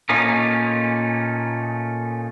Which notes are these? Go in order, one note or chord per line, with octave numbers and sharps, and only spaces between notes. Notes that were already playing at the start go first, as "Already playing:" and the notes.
A#2 A3 A#3 C#4 D#4